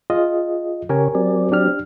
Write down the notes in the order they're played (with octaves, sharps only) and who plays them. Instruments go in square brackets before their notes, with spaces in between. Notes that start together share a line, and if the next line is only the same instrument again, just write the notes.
[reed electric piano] F4 G#4 D#5
[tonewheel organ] C#3 C#5 [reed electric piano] G4 A#4 G#5
[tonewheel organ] F#3 C4 D5
[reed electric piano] D4 G4 F6